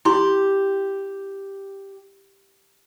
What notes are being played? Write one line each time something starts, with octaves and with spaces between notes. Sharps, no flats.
E4 G4 C6